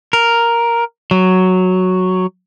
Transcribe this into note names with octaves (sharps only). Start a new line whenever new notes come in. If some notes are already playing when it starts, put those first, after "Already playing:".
A#4
F#3